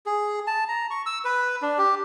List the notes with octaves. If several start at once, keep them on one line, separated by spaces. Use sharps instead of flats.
G#4
A5
A#5
C#6
E6
B4
D4
G4